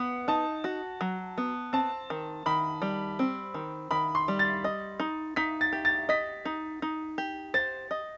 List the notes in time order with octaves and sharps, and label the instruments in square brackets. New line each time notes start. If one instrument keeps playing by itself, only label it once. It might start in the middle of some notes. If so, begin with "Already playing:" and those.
Already playing: [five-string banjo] B3 [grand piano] F#5
[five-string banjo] D#4 [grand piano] A5
[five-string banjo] F#4
F#3
B3
[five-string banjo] C4 [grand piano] A5
[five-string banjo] D#3
[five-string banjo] D#3 [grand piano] B5
[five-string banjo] G3
C4
D#3
[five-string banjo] D#3 [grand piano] B5
[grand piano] C6
[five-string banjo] G3
[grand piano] A6
[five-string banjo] D#5
D#4
[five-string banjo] D#4 [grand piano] B6
[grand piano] A6
[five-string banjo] G4
[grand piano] A6
[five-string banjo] D#5 [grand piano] B6
[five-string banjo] D#4
D#4
G4
[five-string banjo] C5 [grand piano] A6
[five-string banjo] D#5